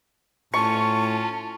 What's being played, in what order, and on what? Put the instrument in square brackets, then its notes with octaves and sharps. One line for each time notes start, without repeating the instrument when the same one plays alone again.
[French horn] A2 [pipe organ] C#4 F4 [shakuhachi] A5 [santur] C#6